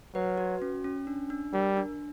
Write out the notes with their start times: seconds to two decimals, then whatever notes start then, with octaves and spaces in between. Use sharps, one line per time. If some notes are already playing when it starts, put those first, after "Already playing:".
0.14 F#3 B4
0.38 F#4
0.62 C#4
0.84 C#4
1.07 D4
1.30 D4
1.53 G3 A#4
1.77 D4